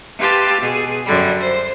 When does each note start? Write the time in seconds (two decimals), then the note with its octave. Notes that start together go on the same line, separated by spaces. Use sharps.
0.18 G4 B4 F5 A5 C6 E6
0.60 B2 G#4
1.05 F#2 D3 G3
1.39 C5